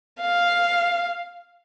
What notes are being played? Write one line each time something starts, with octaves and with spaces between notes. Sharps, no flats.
F5